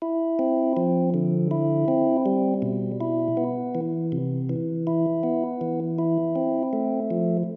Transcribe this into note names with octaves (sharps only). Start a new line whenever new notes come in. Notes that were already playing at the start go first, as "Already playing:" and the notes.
E4
C4
F3
D3
E4
C4
G3
B2
E4
B3
E3
C3
E3
E4
B3
E3
E4
C4
A3
F3